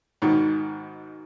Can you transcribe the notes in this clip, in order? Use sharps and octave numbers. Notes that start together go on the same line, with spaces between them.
G#2 B2 D#3